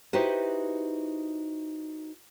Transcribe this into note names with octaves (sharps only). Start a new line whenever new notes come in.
D#4 E4 F#4 G4 B4 C5